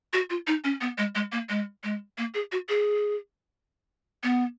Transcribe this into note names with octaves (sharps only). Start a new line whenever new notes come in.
F#4
F4
D#4
C#4
B3
G#3
G#3
A#3
G#3
G#3
A#3
G#4
F#4
G#4
B3